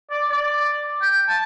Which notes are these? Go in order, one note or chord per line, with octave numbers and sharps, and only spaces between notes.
D5
D5
G5
A5